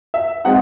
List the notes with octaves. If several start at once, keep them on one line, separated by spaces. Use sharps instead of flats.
E5
G#3 C4 D#4 F#5